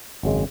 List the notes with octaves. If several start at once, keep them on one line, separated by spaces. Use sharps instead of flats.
G#1 F#2 C#3 G#3